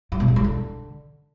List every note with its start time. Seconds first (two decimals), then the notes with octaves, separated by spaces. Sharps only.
0.12 G2
0.20 B2
0.28 G#2
0.36 G2
0.44 D3